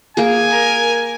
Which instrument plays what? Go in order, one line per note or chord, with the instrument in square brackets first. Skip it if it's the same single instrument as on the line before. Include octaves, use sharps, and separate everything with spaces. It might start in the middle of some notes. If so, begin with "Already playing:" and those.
[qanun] A#3 G#4 [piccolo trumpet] G#5
[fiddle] A#4